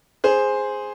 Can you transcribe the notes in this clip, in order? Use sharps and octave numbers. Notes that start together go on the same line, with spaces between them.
G#4 C5